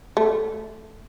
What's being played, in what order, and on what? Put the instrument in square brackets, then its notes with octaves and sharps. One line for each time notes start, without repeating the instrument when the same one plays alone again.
[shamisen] A3